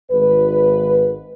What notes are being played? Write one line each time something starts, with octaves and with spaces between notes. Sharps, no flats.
G#1 B4